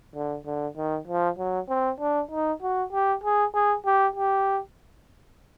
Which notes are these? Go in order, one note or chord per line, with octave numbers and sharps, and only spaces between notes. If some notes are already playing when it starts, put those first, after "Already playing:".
D3
D3
D#3
F3
F#3
C4
D4
D#4
F#4
G4
G#4
G#4
G4
G4